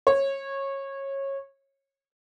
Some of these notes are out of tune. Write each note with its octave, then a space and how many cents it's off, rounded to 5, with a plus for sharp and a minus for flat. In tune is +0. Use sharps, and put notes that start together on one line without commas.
C#5 -20